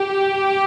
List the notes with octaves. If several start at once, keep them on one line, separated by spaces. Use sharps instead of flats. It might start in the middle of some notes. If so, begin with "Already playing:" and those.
Already playing: G4